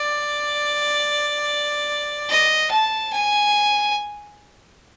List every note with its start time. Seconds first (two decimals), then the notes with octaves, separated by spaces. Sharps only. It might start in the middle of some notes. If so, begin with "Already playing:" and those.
Already playing: D5
2.29 D#5
2.71 A5
3.13 G#5